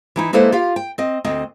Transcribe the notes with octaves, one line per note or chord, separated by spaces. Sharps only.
E3 D#4 E4
G#3 A#3 E4 A4 B4 C5
F4 G4 F5
G5
C4 D#5
D2 C4 D#5